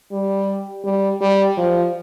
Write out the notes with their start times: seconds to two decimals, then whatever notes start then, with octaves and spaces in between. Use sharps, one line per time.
0.12 G3
0.84 G3
1.21 G3
1.57 F3